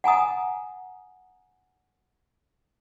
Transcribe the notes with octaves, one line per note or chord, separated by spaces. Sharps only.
F#5 G#5 A#5 D#6